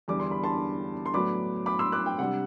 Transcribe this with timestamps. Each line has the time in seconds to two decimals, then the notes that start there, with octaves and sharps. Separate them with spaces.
0.08 E2 D3 G3 D6
0.20 C6
0.31 B5
0.44 A5 C6
1.06 C6
1.13 A2 F#3 B3 D4 B5 D6
1.66 B5 D6
1.79 C6 E6
1.92 D6 F#6
2.06 G5
2.19 C3 G3 D4 F#5